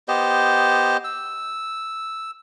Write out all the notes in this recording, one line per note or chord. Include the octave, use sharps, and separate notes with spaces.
B3 G4 C5 D#5
E6